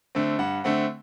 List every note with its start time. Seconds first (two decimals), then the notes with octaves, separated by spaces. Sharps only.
0.15 D3 A3 C4
0.39 G2 F#5
0.64 D3 A3 C4 F#5